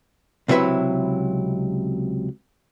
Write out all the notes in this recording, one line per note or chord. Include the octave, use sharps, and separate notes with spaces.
C#2 C3 F#3 E4 B4 E5